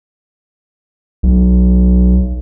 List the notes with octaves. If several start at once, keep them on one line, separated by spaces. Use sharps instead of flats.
B1